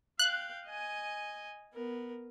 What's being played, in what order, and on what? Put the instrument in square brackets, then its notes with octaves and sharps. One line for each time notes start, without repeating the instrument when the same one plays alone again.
[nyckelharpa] F5 G5 [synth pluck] F#6
[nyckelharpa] D#5 G#5
B3 A#4